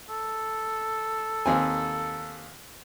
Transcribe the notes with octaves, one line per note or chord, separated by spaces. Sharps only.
A4
D#2 C4 G#5